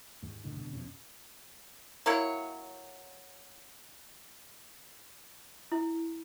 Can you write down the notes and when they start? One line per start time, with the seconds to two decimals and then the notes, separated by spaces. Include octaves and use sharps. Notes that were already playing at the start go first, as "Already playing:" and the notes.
0.23 D#2 G#2
0.44 F#1 A2 D3 D#3
0.57 D#1 B2 D3
0.73 D#1 F2 B2 C#4
2.06 F#3 A#3 E4 C#5
5.72 E4